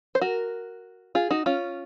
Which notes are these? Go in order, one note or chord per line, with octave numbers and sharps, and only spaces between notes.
C5
F#4 A#4
F4 G#4
D#4 F#4
C#4 F4